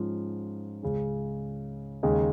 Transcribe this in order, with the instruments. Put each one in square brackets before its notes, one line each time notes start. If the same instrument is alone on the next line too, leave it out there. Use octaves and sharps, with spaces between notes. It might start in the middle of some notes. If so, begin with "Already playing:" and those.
Already playing: [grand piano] G#2 F3 C#4 F4
C#2 C#3 G#3 C#4
D#2 C#3 G#3 D#4